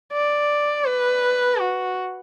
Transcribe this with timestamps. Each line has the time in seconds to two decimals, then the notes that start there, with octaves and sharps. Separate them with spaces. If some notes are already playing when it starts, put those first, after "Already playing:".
0.13 D5
0.86 B4
1.60 F#4